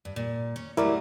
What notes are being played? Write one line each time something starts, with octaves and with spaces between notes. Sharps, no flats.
G2
A#2
C#4
F#3 G3 A3 E4 A#4 D5